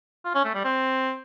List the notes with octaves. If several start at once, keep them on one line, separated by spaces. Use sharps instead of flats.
F4
C#4
A3
G3
C4